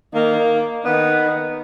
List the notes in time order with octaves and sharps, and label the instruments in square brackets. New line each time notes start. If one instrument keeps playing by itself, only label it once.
[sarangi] D#3 [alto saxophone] A#3
[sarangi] D#3 [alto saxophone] B3